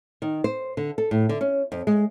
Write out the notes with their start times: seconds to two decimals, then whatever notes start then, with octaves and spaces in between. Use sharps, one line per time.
0.22 D#3
0.44 C5
0.77 D3
0.98 A4
1.11 A2
1.29 D3
1.41 C#4
1.72 F2
1.87 G#3